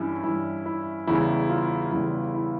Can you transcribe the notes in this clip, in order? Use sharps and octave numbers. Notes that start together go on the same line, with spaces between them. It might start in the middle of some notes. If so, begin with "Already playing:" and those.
Already playing: G2 E3 G3 C#4 E4
G2 E3 G3 E4
E4
E2 C#3 G3 E4
F4
E2 C#3 G3 E4
E4